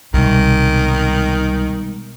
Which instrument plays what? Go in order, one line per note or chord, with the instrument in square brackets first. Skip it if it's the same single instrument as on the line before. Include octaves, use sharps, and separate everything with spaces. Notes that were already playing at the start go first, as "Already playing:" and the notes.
[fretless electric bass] C2 [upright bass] B2 [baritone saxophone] D#3 [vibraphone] G3 G#3